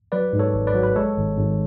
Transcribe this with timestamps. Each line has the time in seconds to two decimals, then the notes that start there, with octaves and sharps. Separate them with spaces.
0.12 F#3 B4 D5
0.33 G#2
0.39 A4 C#5
0.54 G#1
0.67 B4 D5
0.74 F#3
0.83 B4
0.95 G#3 A4 C#5
1.17 G#1
1.37 G#1